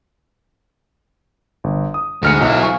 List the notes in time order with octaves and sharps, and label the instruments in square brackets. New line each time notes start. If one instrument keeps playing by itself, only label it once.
[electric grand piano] G1
D#6
[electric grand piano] D2 F6 C#7 [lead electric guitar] G#2 G#3
[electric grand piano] B1 [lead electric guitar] F#3 E4
[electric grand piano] F5 G#5 C#6